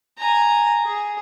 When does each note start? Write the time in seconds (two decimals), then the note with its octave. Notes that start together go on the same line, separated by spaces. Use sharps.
0.18 G#5 A#5
0.84 G#4